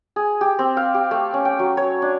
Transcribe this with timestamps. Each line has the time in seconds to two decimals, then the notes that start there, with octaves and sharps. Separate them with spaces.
0.16 G#4
0.41 G4
0.59 C4
0.77 F5
0.94 G4
1.11 A3
1.34 C#4
1.45 G5
1.59 F#3
1.77 C#5
2.02 D4